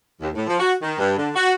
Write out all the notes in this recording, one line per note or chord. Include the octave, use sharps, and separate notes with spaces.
D#2
A2
F3
F#4
D#3
G2
D3
F#4